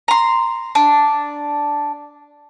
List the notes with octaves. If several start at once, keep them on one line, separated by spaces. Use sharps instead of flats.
A#5 C6
D4